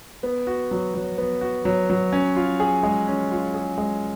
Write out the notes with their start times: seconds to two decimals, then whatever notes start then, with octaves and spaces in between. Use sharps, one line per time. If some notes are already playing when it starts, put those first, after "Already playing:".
0.23 B3
0.47 F#4
0.71 F#3
0.94 F#3
1.18 B3
1.41 F#4
1.65 F#3
1.90 F#3
2.12 C#4
2.36 F4
2.60 G#4
2.83 G#3
3.07 C#4
3.31 F4
3.54 G#4
3.78 G#3